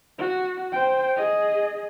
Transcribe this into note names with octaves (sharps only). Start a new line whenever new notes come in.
F#4
C5 G5
G#4 D#5